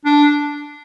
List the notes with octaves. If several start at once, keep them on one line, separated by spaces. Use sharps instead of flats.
D4